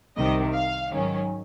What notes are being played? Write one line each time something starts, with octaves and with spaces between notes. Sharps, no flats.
C2 C3 D#3 D#5
F5
G#2 D#3 F#3 C#4